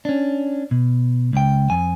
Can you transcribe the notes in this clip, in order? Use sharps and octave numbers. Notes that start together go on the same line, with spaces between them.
C#4 D4
B2
C#2 G5
F2 G#5